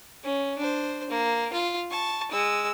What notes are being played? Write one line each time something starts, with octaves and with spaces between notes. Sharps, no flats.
C#4
D4 C5
A#3
F4
A5 C#6
G#3 E6